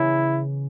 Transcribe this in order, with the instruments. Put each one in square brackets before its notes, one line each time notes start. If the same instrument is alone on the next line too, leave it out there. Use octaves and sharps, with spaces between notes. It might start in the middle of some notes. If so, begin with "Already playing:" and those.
Already playing: [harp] C#3 E3 B3 [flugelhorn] E4